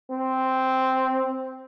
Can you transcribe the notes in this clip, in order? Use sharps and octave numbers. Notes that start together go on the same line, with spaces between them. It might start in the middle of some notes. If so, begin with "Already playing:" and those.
C4